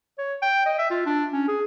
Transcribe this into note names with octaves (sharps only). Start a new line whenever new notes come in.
C#5
G5
D#5
E5
F4
D4
C#4
G#4